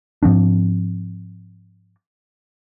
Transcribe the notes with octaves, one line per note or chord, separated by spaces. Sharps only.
G#2 F3 C4 D4